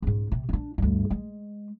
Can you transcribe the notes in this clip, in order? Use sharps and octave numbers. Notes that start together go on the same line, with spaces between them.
C#2 G#2
C3
C#4 D4
D2 G2
G#3